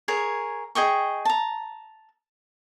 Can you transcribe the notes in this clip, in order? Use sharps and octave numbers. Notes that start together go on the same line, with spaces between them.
G#4 A#4 C#5
G#4 D#5 G5 C#6
A5 A#5